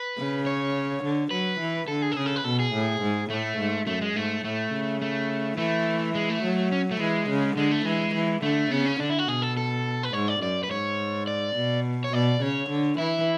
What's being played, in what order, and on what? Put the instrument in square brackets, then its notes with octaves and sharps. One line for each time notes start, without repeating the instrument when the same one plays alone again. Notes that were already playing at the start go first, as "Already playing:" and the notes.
Already playing: [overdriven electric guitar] B4
[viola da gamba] C#3
[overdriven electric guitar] C#5
[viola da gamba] D3
[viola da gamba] F#3 [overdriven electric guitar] B4
[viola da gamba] E3
[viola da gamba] D3 [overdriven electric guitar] A4
[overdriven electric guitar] G#4
A4
[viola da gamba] C#3 [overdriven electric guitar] G#4
[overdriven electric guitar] A4
B4
[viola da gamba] B2 [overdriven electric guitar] A4
[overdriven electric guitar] G#4
[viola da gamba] A2
G#2
[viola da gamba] A2 [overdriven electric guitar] A3
[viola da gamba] G#2
[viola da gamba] F#2 [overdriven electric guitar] A3
[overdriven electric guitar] G#3
[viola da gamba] G#2 [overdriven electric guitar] A3
[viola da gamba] A2 [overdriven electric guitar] A3
[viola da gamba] C#3
[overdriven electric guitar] A3
[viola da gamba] E3 [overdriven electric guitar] A3
[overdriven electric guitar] G#3
A3
[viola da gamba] F#3
[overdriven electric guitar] C#4
A3
[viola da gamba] E3 [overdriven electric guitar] G#3
[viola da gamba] C#3
[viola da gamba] D3 [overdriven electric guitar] G#3
[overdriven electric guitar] A3
[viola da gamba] E3 [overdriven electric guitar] G#3
[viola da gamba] E3
[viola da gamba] D3 [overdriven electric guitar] A3
[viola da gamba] C#3 [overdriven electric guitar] B3
[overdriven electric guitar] C#4
[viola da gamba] D3 [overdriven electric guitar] D4
[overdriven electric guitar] E4
F#4
[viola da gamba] B2 [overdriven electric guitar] G#4
[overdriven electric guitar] A4
A4
B4
[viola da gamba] G#2 [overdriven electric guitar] C#5
[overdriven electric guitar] D5
[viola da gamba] F#2 [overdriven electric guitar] D5
[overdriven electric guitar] B4
[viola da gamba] G#2 [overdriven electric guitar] C#5
[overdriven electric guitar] D5
[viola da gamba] B2
[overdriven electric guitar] C#5
[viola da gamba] B2 [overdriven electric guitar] D5
[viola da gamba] C#3 [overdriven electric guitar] C#5
[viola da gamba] D3
[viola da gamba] E3 [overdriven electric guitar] E4